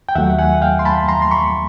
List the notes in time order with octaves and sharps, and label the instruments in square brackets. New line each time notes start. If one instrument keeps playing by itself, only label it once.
[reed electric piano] G5
D#2 D#3 F#3 A3 E5 F#5
F#5 G#5
F5 G5
C6
A5 B5
A#5 C6
C6
B5 C#6